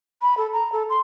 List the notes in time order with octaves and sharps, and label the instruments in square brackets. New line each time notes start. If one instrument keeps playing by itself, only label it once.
[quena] B5
A4
A#5
A4
C6